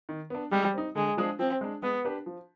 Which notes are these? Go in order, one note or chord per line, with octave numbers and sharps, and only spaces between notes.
D#3
B3 D4
G3 G#3
C4 D#4
D3 G#3
F3 G#3 D4 G#4
F3 C4
G#3 D4
G#3 B3
D4 G4 B4
F3